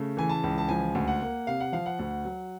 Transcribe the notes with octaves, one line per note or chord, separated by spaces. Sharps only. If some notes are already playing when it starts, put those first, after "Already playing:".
Already playing: C#3 A3
E3 G#5
A5
C#2
A5
F3 G#5
D2
F#5
A#3
C3 F5
F#5
F3 F5
F#5
D2
F#3